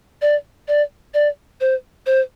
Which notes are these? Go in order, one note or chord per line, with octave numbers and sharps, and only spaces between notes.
D5
D5
D5
C5
C5